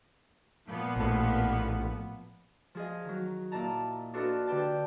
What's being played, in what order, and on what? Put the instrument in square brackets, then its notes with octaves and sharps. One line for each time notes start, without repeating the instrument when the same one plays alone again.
[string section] A#2 F3 B3
[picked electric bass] A#1 A2
[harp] F3 G#4 D#5
D#3 F#3
A#2 E4 D#5 A5 A#5
D4 F4 F#4 A4 B4 D#5
D3 G4 B4 G5 A5